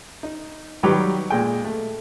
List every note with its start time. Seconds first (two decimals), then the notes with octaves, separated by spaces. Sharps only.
0.23 D#4
0.83 D#3 F#3 G3 G4 B4 B5
1.30 A#2 G#3 G5
1.65 A3